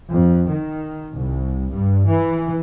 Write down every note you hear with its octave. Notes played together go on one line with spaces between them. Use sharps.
F2
D#3
C2
G2
E3